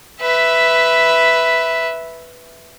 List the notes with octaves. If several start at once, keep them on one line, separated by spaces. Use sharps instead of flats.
B4 E5